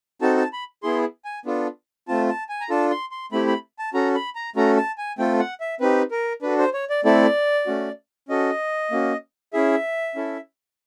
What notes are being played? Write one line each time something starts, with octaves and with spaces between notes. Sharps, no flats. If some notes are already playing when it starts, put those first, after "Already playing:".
C4 D#4 F#4 A4 A5
A5
B5
B3 E4 G#4 C6
G#5
B3 D4 F4 A4
A3 C4 F4 A5
A5
G#5
A#5
D4 F4 A4 A5
C6
C6
A3 C4 E4 G4 B5
B5
A5
C#4 F#4 A4 A#5
B5
A#5
A3 C#4 F#4 A4 A#5
A5
G#5
A3 C4 F4 A4 G5
F#5
E5
C4 D#4 G4 B4
A#4
D4 F#4 A4 B4
C5
C#5
D5
A3 C4 E4 A4 D5
A3 C#4 F#4
C#4 F#4 A4 D#5
A#3 C#4 F#4
C#4 E4 G#4 E5
C#4 E4 A4